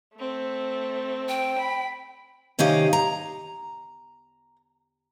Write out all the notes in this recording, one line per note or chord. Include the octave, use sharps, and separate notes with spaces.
A3 C4
G5
B5
C3 D#3 C#4 G4 D#5 F5
A#5